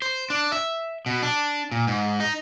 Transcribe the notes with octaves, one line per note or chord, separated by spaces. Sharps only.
C5
D4
E5
B2
D4
A#2
G#2
D#4